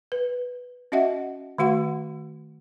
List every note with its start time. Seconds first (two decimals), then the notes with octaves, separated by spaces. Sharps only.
0.12 B4
0.92 C#4 F#4 D#5 E5 F#5
1.58 D#3 A3 F#4 F#5 C6